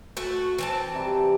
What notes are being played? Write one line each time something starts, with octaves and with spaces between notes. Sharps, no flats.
A3 F#4
E3 C4 A5
C3 G3 A#5